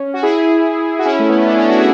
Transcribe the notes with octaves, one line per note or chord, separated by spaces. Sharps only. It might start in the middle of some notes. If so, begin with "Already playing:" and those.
Already playing: C#4
F#4
E4 G#4
F#4
C#4 E4
A3
B3
C#4
B3 D4
C#4 E4
D4 F#4
E4 G#4